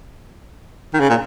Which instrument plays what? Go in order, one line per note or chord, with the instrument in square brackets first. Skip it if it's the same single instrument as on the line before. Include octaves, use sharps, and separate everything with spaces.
[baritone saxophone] D#3
C#3
A#2